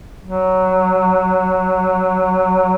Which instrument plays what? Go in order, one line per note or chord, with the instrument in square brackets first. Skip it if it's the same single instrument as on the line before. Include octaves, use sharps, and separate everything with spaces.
[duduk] F#3